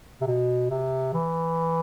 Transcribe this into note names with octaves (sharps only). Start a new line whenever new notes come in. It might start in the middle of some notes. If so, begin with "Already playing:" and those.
C3
B2
C3
E3